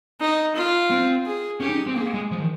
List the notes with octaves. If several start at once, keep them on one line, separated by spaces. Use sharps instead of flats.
D#4
F4
C4
G#4
C#4 G4
D#4
C4
A#3 G#4
G#3
F3
D#3